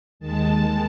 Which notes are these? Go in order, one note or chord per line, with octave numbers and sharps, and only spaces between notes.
D#2 D#3 G#3 A5